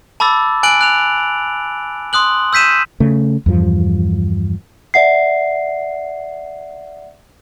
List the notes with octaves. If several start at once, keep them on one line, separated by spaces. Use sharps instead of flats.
A5 B5 D6 E6 A6
G#5 F#6 D7 F#7
F#6 F7
C6 D#6 F#6 F#7
E6 G6 B6 D#7 E7
C#3 A3
E2 G2 F3
D5 E5 F#5 C7